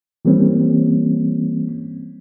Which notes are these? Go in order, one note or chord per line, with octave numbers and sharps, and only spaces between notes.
E3 G3 A#3 C4 C#4